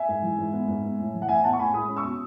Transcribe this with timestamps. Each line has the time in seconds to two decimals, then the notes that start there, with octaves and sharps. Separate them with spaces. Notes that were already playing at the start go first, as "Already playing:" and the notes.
Already playing: E5 G#5
0.09 G#2
0.23 E3
0.38 G#2
0.53 B3
0.68 G#2
0.84 B3
0.99 A2
1.14 E3
1.22 F#5
1.29 A2 E5 G#5
1.44 B3 F#5 A5
1.53 C#6
1.59 A2 G#5 B5
1.74 G#3 B5 D#6
1.89 C#4
1.96 C#6 E6
2.04 B2